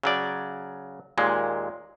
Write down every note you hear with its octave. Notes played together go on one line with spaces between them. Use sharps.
C#3 F#3 D5
D#2 A#2 G#3